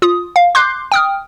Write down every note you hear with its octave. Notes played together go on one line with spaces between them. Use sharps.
F4 D#6
F5
C6 D6 F#6 G6 C7
G5 D#6 F6